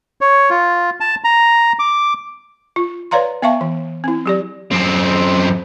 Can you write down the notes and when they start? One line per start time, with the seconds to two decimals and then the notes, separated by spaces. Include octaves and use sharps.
0.21 C#5
0.50 F4
1.00 A5
1.24 A#5
1.79 D6
2.76 F4
3.11 B4 C#5 D5 F5 A#5 C6
3.42 B3 E5 F5 A5 C#6
3.61 E3
4.04 C4 E4
4.26 F#3 G4 D5
4.71 F#2 C4